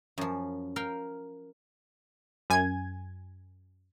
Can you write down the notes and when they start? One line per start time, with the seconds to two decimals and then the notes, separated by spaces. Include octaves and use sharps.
0.18 F#2 F3
0.76 A#4 F5 G5
2.50 F#2 G#5 G#6